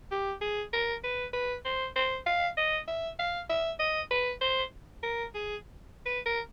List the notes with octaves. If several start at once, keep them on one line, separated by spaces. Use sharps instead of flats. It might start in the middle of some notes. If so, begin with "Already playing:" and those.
G4
G#4
A#4
B4
B4
C5
C5
F5
D#5
E5
F5
E5
D#5
B4
C5
A#4
G#4
B4
A#4